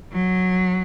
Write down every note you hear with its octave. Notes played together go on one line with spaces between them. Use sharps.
F#3